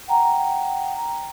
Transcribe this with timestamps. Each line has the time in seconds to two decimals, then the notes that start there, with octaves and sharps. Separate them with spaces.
0.08 F#5 G5 A#5